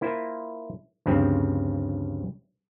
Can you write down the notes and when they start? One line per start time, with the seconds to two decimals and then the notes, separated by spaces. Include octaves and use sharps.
0.01 A#3 E4 F4 C5
1.06 D2 G2 C#3 F3 C4